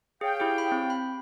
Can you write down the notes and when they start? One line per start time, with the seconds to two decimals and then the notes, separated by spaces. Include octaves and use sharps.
0.21 G#4 C#5 F5 G5
0.40 E4 G4 G#4
0.58 B5
0.72 C4
0.90 B5